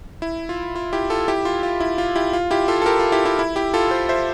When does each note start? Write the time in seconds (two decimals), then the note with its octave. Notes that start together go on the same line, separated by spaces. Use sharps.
0.22 E4
0.49 F4
0.75 F4
0.93 E4 G4
1.10 F4 A4
1.28 E4 G4
1.45 F4
1.63 F4
1.80 E4
1.98 F4
2.16 E4 G4
2.33 F4
2.51 E4 G4
2.68 F4 A4
2.82 A4
2.86 G4 A#4
2.99 F4
3.12 E4 G4
3.25 E4 G4
3.39 E4
3.56 E4 G4
3.74 F4 A4
3.91 A4 C5
4.09 C5 E5